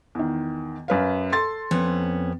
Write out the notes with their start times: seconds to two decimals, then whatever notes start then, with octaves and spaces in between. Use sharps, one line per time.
0.15 E2 D#3
0.88 F#2 B4 F5
1.32 A4 C6 A6
1.71 F2 B3 C#4